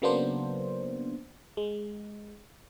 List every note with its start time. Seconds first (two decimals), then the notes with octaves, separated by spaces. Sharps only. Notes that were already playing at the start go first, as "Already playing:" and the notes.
0.02 C#3 F#3 A#3 B3 D4 C5
1.57 G#3